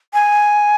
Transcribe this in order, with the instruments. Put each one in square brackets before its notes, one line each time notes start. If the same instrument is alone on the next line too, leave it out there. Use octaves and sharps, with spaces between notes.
[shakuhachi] G#5